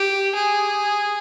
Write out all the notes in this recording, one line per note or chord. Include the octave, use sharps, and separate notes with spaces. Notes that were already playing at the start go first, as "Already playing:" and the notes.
Already playing: G4
G#4